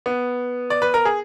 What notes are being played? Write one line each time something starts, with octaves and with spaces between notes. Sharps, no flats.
B3
D5
B4
A#4
G#4